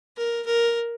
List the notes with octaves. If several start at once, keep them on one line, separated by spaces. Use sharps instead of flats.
A#4
A#4